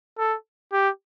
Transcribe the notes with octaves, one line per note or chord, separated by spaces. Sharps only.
A4
G4